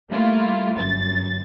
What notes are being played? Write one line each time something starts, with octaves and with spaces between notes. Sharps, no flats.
G3 A3 A#3 E4 F4
G1 F#2 A6